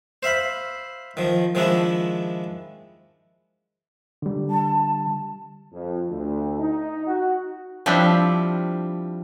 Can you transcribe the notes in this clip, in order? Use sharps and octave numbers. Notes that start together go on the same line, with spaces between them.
C5 E5 F5 B5
D#3 F3
D#3 F3 G#3 D4 E4
D3 G3
A5
F2
D2
D#4
F#4
F3 G3 C4 D4 E4